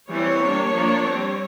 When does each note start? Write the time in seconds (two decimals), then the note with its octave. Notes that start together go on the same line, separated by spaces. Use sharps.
0.09 E3 G3 C4 C#5
0.41 G3 A#3 D4
0.74 F3 A#3 D4
1.05 G3 C4